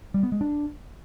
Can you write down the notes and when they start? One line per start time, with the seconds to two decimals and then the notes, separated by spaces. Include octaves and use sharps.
0.14 G3
0.23 B3
0.32 G#3
0.41 D4